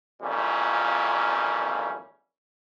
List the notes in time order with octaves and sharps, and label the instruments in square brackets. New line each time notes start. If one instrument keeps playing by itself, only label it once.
[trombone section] G#1 F2 A#2 E3 G3 C#4